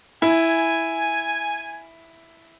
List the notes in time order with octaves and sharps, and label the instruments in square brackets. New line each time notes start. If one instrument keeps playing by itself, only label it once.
[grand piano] E4 [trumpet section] G#5